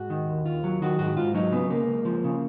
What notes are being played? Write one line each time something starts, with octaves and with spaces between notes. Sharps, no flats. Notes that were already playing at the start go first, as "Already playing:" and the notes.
Already playing: G#2 F#4
D#3
D#2
D#2 F4
F#3
D#3 F#4
G#2 F#4
G#2 F4
F#3 D#4
C#3 B3
C#2 A#3
C#2
F3
C#3